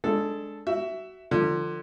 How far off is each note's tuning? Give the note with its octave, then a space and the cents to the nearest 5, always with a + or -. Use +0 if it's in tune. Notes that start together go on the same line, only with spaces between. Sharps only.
G#3 +10 D4 -10 A4 +0
F#4 +20 E5 +5
D3 +30 F3 +0